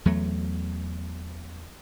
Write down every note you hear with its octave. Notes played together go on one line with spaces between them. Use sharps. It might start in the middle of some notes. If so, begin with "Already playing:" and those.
E2 F#3 A3